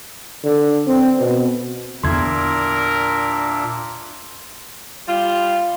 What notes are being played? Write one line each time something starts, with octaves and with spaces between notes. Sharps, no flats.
D3
C4
B2
E2 A#2 D3 D4 A#4 E5 C6 G#6
G3 F4